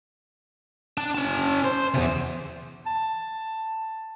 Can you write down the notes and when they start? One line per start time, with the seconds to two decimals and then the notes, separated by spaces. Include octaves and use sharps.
0.98 D4 A5
1.15 C#4 A5
1.64 C5
1.94 E2 C3
2.86 A5